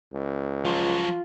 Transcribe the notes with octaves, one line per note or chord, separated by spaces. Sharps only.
C#2
F3 F#3 F4